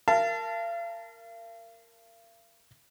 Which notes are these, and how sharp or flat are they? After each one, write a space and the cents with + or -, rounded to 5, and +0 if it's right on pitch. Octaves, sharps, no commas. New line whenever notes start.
A#4 -15 F5 -40 A5 +0